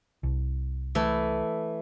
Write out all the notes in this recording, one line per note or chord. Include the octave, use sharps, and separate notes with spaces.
C2
E3 A3